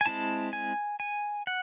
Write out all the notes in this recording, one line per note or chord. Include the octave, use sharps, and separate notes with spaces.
G#5
G#3 C4 E4 A5
G#5
G#5
F#5